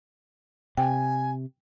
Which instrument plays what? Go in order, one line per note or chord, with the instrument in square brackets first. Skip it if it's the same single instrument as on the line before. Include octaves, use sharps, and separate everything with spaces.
[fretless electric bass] C3 [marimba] G5 [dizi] G#5